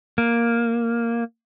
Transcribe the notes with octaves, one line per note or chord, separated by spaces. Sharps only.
A#3